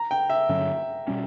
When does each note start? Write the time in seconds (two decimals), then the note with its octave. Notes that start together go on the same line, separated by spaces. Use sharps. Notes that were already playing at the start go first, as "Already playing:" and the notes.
Already playing: A#5
0.11 G5
0.30 E5
0.49 G2 D3 F#3 C#4
1.08 B2 G3 C#4